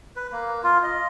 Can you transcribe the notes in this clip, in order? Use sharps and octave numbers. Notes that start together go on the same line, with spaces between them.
B4
A#3
F4
D#5